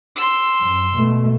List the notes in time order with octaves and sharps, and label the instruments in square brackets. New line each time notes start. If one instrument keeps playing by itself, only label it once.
[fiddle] C6 E6
[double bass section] F#2
B2 A3